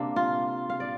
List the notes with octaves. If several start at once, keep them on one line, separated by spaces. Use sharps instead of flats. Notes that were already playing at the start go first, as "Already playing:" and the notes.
Already playing: C3 A#3 D4
F4
F5
D5